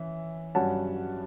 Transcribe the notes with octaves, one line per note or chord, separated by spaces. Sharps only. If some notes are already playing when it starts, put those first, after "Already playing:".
Already playing: E3 C#4 E5
G2 F#3 C#4 F#5 A5